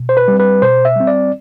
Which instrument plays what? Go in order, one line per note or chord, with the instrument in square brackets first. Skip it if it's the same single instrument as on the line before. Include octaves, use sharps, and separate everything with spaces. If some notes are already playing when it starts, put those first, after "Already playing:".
Already playing: [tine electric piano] B2
C5
B4
G3 C4
B4
B2 C5
E5
G3 C4
D5